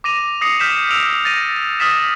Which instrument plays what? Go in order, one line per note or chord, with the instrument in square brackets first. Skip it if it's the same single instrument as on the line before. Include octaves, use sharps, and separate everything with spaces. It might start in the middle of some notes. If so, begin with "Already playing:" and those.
[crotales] D6 A#6 D#7 F7
D#6 A#6 C7 C#7 F7
F6 G6 B6 E7
E6 D7 E7 F7
A6 A#6 D#7
D#6 F6 A6 B6 E7